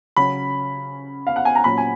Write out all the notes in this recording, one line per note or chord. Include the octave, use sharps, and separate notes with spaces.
C#3 F#3 C#4 B5
F5
F#5
G#5
A#5
A#2 F#3 C#4 B5
G#5